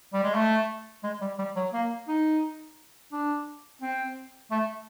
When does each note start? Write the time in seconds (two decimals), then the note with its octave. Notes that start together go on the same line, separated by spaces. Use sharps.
0.13 G3
0.24 G#3
0.34 A3
1.04 G#3
1.21 G3
1.39 G3
1.56 F#3
1.73 A#3
2.08 D#4
3.12 D4
3.82 C4
4.51 A3